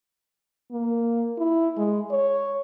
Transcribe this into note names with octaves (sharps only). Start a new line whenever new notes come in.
A#3
E4
G#3
C#5